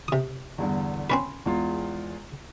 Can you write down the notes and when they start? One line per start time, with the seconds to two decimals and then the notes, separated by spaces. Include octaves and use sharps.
0.08 C3 D#6
0.58 E2 G2 D3
1.10 C4 C#4 B4
1.46 E2 G#3 F4